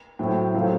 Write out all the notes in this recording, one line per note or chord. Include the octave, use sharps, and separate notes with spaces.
A2 F#3 A3 C4 G5
C#3 F#3 A3 C4 F5